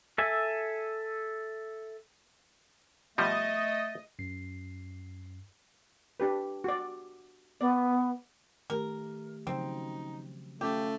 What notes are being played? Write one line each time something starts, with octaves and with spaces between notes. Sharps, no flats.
A4 E5 G#5
B2 F3 G3 A3 D#5
F#2 C7
D4 G4 B4
F#4 D5
B3 D5
D#3 A3 G4 A#4
C#3 F3 F#3 C4 D#4
A3 C#4 F4 G4